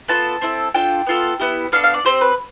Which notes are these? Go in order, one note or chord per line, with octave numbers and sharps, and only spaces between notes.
B3 F4 A4 A5
C4 E4 A4
D4 F4 A4 G5
B3 F4 A4
B3 E4 G4
B3 D4 A4 F5
F5
D5
C4 G4 C5
B4